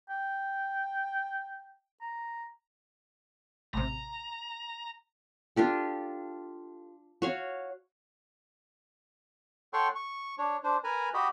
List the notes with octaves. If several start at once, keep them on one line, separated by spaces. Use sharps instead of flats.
G5
A#5
A1 C3 A#5
D4 F4 G4 A4
F#4 C#5 F5
A4 C#5 F#5 G5 C6 C#6
C#6
D4 C#5
D4 C5
A#4 B4 G#5 A#5
F#4 G4 D#5 B5